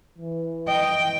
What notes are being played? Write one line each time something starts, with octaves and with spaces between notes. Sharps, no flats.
E3
D#5 G5